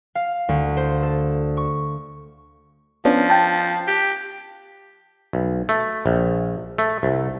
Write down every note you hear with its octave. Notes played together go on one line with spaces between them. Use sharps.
F5
D2
C5
A4
C#6
F3 B3 C#4 D4
G5 A5
G4
B1
A3
A#1
A3
C2